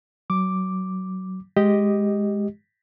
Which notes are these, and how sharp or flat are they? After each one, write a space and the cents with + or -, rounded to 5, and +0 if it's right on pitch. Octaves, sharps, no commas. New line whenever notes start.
F#3 +20 D6 +0
G#3 +0 G4 +0 D#5 +0